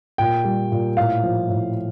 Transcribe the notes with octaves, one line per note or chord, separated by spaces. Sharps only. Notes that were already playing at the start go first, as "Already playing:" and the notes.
A#2 G5
G3
A#2
A2 F5
F3
A2